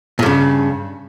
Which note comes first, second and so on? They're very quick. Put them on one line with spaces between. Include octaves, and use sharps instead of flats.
A#2 G2 C#3